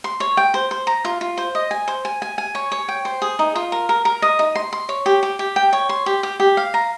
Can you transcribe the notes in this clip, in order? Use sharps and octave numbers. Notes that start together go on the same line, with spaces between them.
C6
C#5
G5
C5
C5
A#5
F4
F4
C5
D#5
G#5
C5
G#5
G#5
G#5
C#5
C#5
G5
C5
G#4
D#4
F4
A#4
A#4
A#4
D#5
D#4
C6
C6
C#5
G4
G4
G4
G5
C#5
C6
G4
G4
G4
F5
A#5